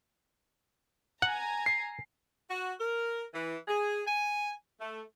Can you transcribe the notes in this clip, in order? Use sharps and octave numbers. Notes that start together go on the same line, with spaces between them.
F#5 G#5 A#5
C7
F#4
A#4
E3
G#4
G#5
A3